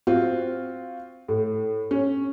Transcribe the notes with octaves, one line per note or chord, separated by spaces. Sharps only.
C4 F4 F#4
A2
C#4